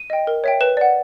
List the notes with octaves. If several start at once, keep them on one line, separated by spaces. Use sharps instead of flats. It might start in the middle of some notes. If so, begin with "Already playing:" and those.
Already playing: D#7
D#5 G5
A#4
C#5 E5 G5
B4 E7
D5 F#5